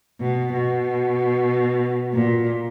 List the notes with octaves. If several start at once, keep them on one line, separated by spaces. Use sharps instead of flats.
B2
B2
A#2